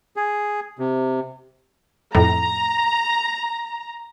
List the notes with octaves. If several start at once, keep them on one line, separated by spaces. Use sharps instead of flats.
G#4
C3
F2 A2 A#5